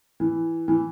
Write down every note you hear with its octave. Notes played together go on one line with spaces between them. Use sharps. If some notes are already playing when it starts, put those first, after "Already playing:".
E3
E3